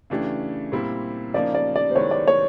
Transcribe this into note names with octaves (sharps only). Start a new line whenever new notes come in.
C#3 E3 A3 D4 G4
A#2 G3 C4 E4
C#3 F3 A#3 D#4 D5
D5
D5
C5
D#3 G#3 B3 E4 C#5
D5
C#5